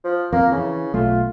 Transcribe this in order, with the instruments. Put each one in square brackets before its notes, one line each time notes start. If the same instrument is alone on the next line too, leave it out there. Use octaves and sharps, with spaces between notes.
[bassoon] F3
[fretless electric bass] F2 [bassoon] A#3
[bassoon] C#3 [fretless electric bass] E3
[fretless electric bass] B1 A3 [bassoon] F4